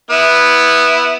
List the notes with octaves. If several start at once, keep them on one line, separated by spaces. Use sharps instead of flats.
B3 E4